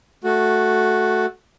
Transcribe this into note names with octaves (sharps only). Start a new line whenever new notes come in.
A3 F#4